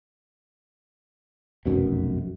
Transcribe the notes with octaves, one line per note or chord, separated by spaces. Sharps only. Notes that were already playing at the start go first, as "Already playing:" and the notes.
F1 B1 F#2 B2